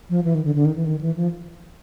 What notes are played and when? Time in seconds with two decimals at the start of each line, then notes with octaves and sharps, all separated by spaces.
0.10 F3
0.24 E3
0.35 D#3
0.45 D3
0.55 D3
0.65 D#3
0.76 E3
0.85 D#3
1.01 E3
1.16 F3